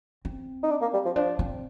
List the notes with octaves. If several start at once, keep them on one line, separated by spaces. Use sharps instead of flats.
C4
D#4
D4
A#3
G3
F3
F3 D4
C4